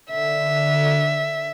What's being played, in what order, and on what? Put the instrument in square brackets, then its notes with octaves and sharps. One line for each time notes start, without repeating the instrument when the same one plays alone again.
[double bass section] D3 [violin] E5